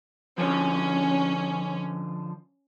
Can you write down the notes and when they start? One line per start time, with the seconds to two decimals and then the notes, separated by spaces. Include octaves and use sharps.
0.38 D3 F3 C#4